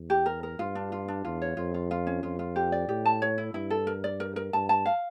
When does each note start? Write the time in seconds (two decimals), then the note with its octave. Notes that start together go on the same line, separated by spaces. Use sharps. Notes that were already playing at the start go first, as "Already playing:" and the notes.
Already playing: E2
0.10 G4
0.26 A#4
0.43 A#4
0.59 G2 F4
0.75 D4
0.92 F4
1.08 D4
1.25 E2 F4
1.42 C#5
1.57 F2 F4
1.74 F4
1.91 F4
2.07 C#4
2.23 F2 F4
2.39 F4
2.56 G4
2.72 D5
2.88 A2 G4
3.06 A5
3.22 C#5
3.38 E4
3.54 G2 E4
3.70 A4
3.87 A#4
4.04 D5
4.20 A#4
4.36 A#4
4.53 G2 A5
4.69 A5
4.86 F5